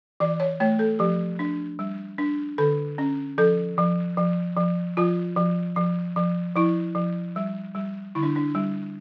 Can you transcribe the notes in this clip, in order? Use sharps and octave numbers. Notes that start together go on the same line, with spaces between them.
E3 D5
C#5
A3 C#5
A4
F3 G4
D4
G3
D4
D3 A4
C#4
F3 A4
F3
F3
F3
F3 F4
F3
F3
F3
F3 E4
F3
G3
G3
D3 E4
D4
D4
G3